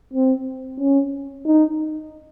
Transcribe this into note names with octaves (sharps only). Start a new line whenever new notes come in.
C4
C#4
D#4